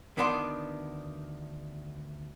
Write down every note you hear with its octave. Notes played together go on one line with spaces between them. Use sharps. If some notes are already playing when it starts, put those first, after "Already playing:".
D2 D#3 B3 D4 F#5 C6